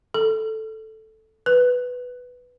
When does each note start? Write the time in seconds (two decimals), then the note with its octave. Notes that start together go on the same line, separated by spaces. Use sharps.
0.14 A4
1.46 B4